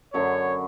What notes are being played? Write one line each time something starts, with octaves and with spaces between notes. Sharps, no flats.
F#2 D3 F#3 C#5